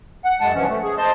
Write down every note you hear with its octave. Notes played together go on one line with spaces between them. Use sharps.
F#5
F#2 G#3 F#5 A5
G2 C3 E3 F3 C#4
A3
G#4
C5 D#5 A5 C6